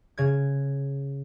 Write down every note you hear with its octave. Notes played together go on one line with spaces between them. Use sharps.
C#3 G#6